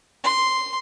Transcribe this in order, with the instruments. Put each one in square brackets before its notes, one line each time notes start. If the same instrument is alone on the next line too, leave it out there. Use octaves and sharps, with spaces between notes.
[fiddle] C6